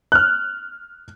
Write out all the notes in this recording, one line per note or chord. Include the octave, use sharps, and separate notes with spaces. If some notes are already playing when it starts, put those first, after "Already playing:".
F6 F#6